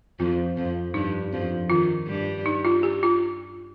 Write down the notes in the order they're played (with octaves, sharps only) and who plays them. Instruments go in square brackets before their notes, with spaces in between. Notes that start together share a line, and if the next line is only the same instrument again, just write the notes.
[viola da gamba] F2 F3 [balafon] F4
[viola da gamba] F2 F3
[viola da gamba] G2 G3 [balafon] D#4
[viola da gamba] F2 F3
[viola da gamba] D#3 [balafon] F4
[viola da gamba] G2 G3
[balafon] D#4
F4
G4
F4